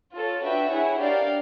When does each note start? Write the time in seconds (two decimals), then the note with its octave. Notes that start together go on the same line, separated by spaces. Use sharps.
0.15 F4 A4 C#5
0.43 D4 F#4 B4 E5 G5
0.71 E4 G#4 C#5 F#5
1.01 D4 G4 A#4 D5 F5